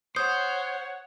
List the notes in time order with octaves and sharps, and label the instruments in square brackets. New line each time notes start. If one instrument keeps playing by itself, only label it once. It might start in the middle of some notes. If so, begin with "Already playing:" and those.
[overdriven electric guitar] C5 [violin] C#5 F#5 [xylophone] D#6 G6